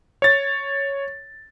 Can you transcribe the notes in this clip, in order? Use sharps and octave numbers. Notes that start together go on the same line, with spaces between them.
C#5 A6